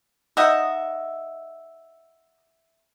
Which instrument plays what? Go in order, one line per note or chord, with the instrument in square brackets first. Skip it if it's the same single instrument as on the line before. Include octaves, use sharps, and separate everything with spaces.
[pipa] D#4 D#5 [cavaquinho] E5 F#5